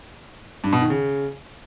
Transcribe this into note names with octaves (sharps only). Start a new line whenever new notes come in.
G2
B2
D#3
C#3